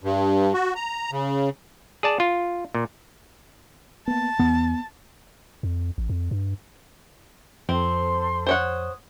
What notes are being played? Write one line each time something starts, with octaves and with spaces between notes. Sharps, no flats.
G2
F#4
A#5
C#3
G#4 D5 A5
F4
A#2
A#3 B3 A5
E2 B3
F2
A1
F2
G2
F2 C4 A4 C5 C6
C5 C#5 F#5 D#6